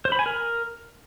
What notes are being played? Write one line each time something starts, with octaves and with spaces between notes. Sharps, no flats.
C5
B5
G#5
A#4